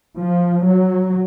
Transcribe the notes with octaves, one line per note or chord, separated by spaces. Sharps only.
F3
F#3